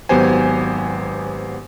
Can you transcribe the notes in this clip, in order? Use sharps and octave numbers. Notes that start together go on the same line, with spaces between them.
G#1 F#3 B3 G4 C5 G#5